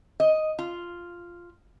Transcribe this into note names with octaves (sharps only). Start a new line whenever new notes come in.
D#5
F4